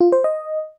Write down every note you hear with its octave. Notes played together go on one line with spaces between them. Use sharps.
F4
C5
D#5